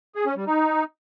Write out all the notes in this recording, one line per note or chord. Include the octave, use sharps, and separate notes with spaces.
G#4
C#4
G3
D#4